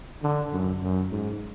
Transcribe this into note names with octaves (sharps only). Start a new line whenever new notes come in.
D3
F#2
F#2
G#2